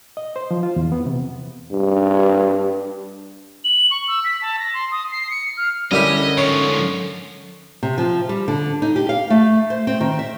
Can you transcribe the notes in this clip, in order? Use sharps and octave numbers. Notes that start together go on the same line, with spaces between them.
D#5
C5
F3
F4
E2
B3
C3
G2
F#7
C#6
E6
B6
A5
A#6
C6
D#6
C7
C#7
F6
D3 G3 A3 C#4 E4 G4 A#4 D#5
G#2 F3 C#5
C3
F3
G3
D3
D#4
G4
F5
A3
C5
C4
D#3
E5